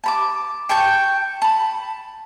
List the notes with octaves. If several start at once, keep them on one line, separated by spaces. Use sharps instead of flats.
A5 B5 D6
G5 A5 C#6 G6
A5 B5